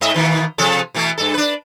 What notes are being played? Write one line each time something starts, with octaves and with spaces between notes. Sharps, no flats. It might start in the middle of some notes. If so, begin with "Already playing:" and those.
G#2 D#5 E5
B2 D#3 A#3
C3 F3 A4
B2 E3 A3
G2 A4
D4 B4